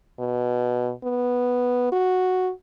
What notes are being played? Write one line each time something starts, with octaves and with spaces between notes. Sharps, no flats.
B2
B3
F#4